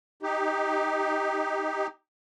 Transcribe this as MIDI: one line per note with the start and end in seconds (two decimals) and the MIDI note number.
0.23 1.87 63
0.23 1.87 67